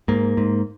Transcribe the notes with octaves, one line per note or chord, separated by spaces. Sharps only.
G#2 A#3
G#2